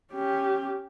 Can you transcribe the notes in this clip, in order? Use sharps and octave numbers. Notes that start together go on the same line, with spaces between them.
C#4 G4